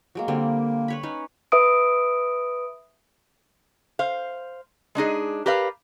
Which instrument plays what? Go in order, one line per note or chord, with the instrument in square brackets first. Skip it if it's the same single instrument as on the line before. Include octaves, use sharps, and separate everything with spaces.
[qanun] F#3 G#3 A#3
[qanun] D3 G3 C4 [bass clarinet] A#3
[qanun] B4 C#5 B5
C#4 D#4 B4
[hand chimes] B4 E5 D#6 D7
[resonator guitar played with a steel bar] C5 F5
G#3 D4 D#4 G#4
G4 A#4 B4 D5 F5